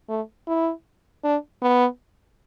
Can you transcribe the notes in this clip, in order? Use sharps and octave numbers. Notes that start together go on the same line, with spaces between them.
A3
E4
D4
B3